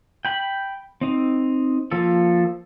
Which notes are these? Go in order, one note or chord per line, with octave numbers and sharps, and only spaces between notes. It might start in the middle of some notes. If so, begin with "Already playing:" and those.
G5 B5
C4 D#4
F3 A#3 A4